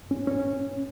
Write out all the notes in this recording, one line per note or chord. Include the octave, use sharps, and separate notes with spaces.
C#4
C#4